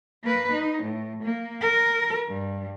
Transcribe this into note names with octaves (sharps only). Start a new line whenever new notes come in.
A#3 B4
D#4
A2
A#3
A#4
G2